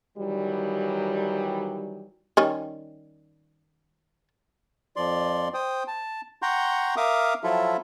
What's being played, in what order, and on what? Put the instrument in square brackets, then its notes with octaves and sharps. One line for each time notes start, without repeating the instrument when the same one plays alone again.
[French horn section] D#3 E3 F#3 G3
[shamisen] D#3 G3 C#4
[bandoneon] F2 F3 D5 C6
C5 G5 D#6
A5
F#5 G5 A#5 C6 C#6 G6
A#4 E5 F5 D6 D#6
F3 F#3 E4 F4 A4 E5